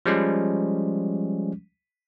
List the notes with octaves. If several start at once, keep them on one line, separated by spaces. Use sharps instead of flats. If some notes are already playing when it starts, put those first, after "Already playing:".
F3 G3 G#3 C#4